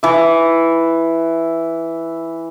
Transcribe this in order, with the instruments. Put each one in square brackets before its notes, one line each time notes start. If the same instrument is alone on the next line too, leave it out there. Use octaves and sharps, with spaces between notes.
[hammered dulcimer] E3 E5